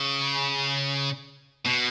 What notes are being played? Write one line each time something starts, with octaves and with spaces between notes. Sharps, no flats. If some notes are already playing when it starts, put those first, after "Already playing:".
Already playing: C#3
B2